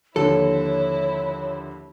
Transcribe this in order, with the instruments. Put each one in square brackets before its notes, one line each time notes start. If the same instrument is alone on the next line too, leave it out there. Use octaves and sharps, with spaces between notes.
[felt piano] D#2 D3 F3 [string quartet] E4 [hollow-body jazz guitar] A4 [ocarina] C#5